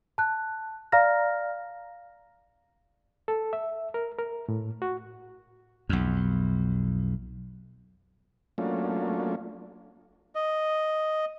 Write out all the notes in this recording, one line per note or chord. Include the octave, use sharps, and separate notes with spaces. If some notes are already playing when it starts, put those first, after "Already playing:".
A5 F#6
D5 F5 A#5 F6 A#6
A4
E5
A#4
A#4
A2
F#4
B1 F2
F#3 A3 A#3 C#4 D4 F4
D#5